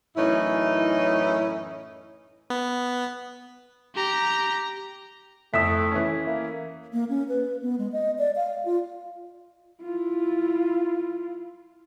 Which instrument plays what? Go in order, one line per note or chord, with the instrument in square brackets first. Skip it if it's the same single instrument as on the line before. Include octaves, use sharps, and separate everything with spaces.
[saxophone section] F#2 A2 E3 C#4 D#4 E4
[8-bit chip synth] B3
[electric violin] G4 A#5
[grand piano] F2 E5 E6 [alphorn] A3 [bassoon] E4 [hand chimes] D#6 B6
[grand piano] E3 C#4
[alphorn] A#3 [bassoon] E4
[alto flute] A#3
C#4
B4
B3
G#3
D#5
D5
F5
F4
[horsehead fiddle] E4 F4